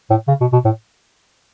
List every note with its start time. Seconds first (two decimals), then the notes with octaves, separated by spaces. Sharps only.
0.10 A2
0.28 C#3
0.41 B2
0.53 B2
0.65 A2